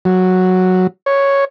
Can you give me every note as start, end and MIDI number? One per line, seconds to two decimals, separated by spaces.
0.05 0.87 54
1.06 1.45 73